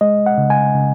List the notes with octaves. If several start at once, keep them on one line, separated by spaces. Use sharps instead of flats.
G#3 D#5
F#5
C#3
G#5
C#3